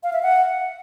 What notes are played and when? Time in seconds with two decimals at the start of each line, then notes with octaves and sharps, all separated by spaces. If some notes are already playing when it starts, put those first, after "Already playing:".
0.03 F5
0.13 E5
0.23 F#5